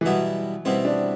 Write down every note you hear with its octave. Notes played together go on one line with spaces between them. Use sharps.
E3
B2 F#3 G3 B3 E4
B2 G3 B3 C4 E4
D4